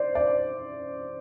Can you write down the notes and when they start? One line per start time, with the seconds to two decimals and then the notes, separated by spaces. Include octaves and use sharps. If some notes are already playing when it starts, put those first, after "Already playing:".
Already playing: C5 D5
0.15 D5